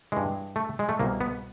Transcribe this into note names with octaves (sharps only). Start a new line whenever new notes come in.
G2 E3 G#3
A3
G#3
A3
C2 B2 A#3
B3